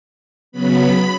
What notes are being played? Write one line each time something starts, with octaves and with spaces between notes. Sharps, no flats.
C#3 F#3 B3 B5